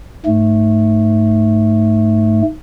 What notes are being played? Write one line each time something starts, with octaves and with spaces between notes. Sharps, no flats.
G#2 A3